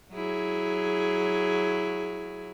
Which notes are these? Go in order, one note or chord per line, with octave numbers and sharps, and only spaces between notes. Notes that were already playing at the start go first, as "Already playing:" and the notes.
F#3 E4 G#4